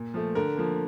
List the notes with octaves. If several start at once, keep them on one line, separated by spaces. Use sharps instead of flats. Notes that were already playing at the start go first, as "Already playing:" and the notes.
Already playing: A#2
F3 A3
D3 A#4
F3 A#3